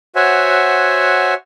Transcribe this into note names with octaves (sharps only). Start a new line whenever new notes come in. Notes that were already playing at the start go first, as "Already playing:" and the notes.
F#4 C5 C#5 E5 F#5 G#5